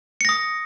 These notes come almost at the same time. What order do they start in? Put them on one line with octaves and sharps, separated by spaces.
C#7 A#6 D#6